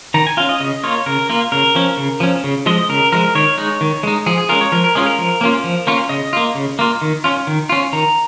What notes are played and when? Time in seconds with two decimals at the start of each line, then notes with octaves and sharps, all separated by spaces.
0.14 D#3 A#5
0.27 G#5
0.37 C#4 F4 F5
0.49 D#5
0.60 C#3 D#5
0.84 A#3 F4 C#5
1.06 C#3 A#4
1.30 A#3 F4
1.52 C#3 A#4
1.75 F3 C#4
1.97 C#3
2.20 F3 C#4
2.44 C#3
2.66 F3 G#3 D#5
2.89 C#3 A#4
3.12 F3 G#3 A#4
3.35 D#3 C#5
3.58 G#3 D#4
3.81 D#3
4.03 G#3 D#4
4.26 F3 G#4
4.38 G#4
4.49 G#3 C#4 F4 A#4
4.61 C#5
4.72 F3 A#4
4.84 A#4
4.95 G#3 C#4 F4 G#4
5.06 A#4
5.18 F3
5.41 A#3 C#4 F4
5.64 F3
5.87 A#3 C#4 F4
6.09 C#3 D#5
6.33 A#3 F4
6.55 C#3
6.79 A#3 F4
7.01 D#3
7.24 C#4 F4
7.47 D#3
7.69 C#4 F4
7.93 D#3 A#5